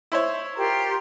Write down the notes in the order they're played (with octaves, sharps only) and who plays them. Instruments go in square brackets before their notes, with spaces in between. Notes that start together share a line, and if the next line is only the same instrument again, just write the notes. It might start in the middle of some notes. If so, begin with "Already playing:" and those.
[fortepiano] E4 C5 C#5
[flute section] F4 G4 C6 [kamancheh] A#4